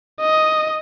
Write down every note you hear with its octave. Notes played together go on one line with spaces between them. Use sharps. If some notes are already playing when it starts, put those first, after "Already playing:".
D#5